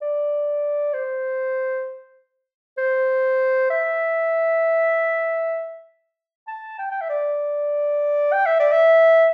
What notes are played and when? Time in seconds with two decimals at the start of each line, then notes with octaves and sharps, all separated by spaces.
0.02 D5
0.93 C5
2.78 C5
3.70 E5
6.47 A5
6.79 G5
6.91 G5
7.01 E5
7.09 D5
8.32 G5
8.46 E5
8.60 D5
8.72 E5